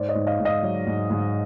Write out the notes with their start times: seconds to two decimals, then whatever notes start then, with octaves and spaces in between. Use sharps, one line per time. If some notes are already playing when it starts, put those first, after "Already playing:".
Already playing: G#2 C5 D5
0.09 C#5 D#5
0.15 G#2
0.27 D#5 F5
0.40 G#2
0.45 D#5 F5
0.63 F#3
0.87 G#2
1.10 G#2